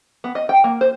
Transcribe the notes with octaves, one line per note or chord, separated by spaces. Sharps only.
B3
D#5
G5
A#3
C5